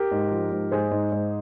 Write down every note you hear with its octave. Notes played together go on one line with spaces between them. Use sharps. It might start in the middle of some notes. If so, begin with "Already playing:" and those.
Already playing: G4 A#4
G#2
F3
G#2
G#2 G#4 C5
G#2
G#2